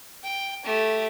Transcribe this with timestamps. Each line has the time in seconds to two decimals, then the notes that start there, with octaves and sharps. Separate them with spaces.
0.23 G5
0.64 A3 G4